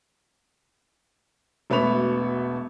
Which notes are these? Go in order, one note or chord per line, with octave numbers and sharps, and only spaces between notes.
E1 A3 B3 F#4 B5 F7